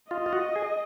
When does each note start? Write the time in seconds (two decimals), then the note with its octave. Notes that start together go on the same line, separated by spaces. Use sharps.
0.11 F4 D#5
0.26 F4
0.33 F#4
0.56 G#4